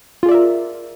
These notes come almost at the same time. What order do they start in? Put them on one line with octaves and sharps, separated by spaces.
F4 G#4 D5 E5 A#4